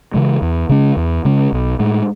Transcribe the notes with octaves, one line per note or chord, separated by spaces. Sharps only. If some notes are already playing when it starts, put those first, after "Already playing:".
C#3 E3 G#3
E2
C#3 G#3 C#4
E2
C#3 G#3 C#4
B1
A2 G#3